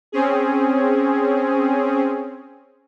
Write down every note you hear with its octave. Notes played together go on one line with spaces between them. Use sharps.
C4 C#4 G#4